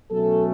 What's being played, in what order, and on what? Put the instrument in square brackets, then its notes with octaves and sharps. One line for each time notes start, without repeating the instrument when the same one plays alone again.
[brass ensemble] B2 F#3 A3 C#4 A4